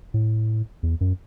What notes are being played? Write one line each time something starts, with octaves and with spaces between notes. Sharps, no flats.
A2
E2
F#2